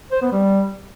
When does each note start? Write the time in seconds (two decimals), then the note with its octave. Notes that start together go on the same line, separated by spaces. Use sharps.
0.12 C5
0.22 B3
0.32 G3